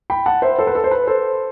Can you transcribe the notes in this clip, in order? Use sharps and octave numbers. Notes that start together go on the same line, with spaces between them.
G5 B5
F#5 A5
C5 E5
A4 C5
B4
A4
C5
B4
A4 C5